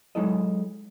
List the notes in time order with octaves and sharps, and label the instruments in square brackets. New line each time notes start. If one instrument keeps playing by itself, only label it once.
[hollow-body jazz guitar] F#3 G#3 D#4 E4 A4 D#5